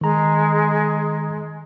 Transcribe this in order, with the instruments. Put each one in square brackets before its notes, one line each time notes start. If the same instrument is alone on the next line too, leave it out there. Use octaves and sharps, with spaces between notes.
[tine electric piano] D#3 A#5 [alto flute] G#3